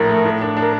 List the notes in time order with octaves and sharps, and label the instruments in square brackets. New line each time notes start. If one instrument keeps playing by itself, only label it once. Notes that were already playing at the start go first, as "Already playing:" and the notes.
Already playing: [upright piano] A#1 A2 [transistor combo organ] A#4
[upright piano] A3
A2
D4
D4
[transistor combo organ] A#4